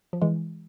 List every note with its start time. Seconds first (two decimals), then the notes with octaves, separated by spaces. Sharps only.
0.13 F3
0.22 E3 G#3